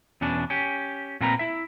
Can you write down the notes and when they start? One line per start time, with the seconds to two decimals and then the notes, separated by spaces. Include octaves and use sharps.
0.21 E2 B2 C#4 D4
0.50 C#4 G4
1.21 A#2 A3 C4 A#4 B4 A#5
1.39 E4 E5